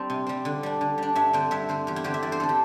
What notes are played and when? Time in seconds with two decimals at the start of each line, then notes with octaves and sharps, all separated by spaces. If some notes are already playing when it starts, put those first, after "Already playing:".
Already playing: G3 C4 D4
0.10 C3
0.27 G3 C4
0.45 D3
0.63 G3 D4
0.81 D3
0.98 G3 D4
1.15 G2 E5
1.33 D3 C4 G5
1.51 G2 E5
1.69 D3 C4 C5
1.87 E2 G4
1.96 E4
2.04 D3 C4 G4
2.14 E5
2.23 E2 D5
2.32 C5
2.40 D3 C4 A4
2.49 G4